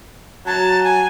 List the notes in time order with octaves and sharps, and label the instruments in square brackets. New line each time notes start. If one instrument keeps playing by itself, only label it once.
[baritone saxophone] F#3 [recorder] A5
[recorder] G#5